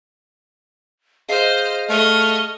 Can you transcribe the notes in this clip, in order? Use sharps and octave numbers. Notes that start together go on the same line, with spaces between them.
G#4 C5 D#5 F5 F6 C7
A3 D#5 C#6 F6